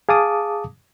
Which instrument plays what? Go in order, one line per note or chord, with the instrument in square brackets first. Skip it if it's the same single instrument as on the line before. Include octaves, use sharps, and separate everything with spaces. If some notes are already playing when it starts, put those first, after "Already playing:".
[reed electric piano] G#4 F5 A5 D6 D#6